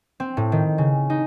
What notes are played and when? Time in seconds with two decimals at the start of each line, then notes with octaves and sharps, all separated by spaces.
0.20 C4
0.37 A2
0.52 D#3
0.78 C#3
1.10 D#4